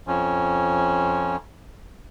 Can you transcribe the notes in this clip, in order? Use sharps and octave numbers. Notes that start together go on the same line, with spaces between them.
F2 F3 C#4